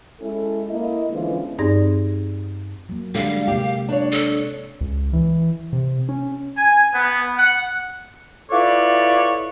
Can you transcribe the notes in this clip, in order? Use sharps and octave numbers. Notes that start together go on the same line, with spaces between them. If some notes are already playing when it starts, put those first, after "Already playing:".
G#3 C#4 E4 A4
A#3 E4 D#5
D3 E3 F3 G#3 B3 C#4
G2 C4 D#4 G#4 D5 A#6
F#3 A#3
D3 G3 G#3 F5
C3 A#3 G4
D4 C#5
A4
C#2
E3
C3
C#4
G#5
B3
F#5
E4 F4 A4 B4 C#5 D5